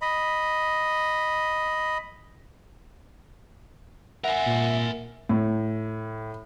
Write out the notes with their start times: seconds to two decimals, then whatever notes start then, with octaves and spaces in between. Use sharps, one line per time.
0.02 D#5 B5
4.24 A#4 E5 F#5 G#5
4.46 A#2
5.29 A2